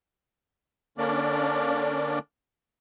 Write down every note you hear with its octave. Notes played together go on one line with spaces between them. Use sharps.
D3 A#3 C#4 D4 D5